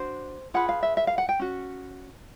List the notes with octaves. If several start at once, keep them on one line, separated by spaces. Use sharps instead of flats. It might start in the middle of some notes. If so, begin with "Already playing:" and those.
Already playing: D4 F#4 C5
F4 G#4 B4 F#5
F5
E5
E5
F5
F#5
G5
C#4 F#4